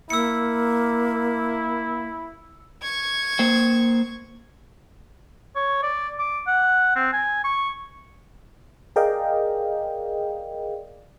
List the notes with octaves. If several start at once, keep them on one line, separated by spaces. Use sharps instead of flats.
A#3 E4 E6 C#7
C#6 G#6
A#3 C5 G5
C#5
D5
D6
F#5
C4
G#5
C#6
G#4 A#4 D5 D#5 F5 G5